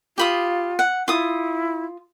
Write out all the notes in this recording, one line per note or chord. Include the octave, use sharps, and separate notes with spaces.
F4 G4 B5 D#6
F#5
E4 F4 D#6